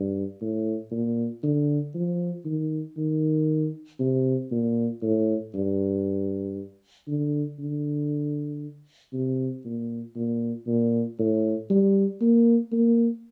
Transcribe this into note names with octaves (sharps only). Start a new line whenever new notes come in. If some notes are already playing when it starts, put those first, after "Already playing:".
Already playing: G2
A2
A#2
D3
F3
D#3
D#3
C3
A#2
A2
G2
D3
D3
C3
A#2
A#2
A#2
A2
G3
A#3
A#3